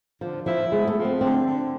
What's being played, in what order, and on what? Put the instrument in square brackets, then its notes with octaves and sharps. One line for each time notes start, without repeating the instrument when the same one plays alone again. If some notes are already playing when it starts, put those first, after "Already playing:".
[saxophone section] D3 [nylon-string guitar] F3
[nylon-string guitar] F3 [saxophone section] E4
[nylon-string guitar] G#3 [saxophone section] B3
[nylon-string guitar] A3
[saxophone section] F3
[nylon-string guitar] C4
[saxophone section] D3 [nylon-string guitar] C4
[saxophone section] D3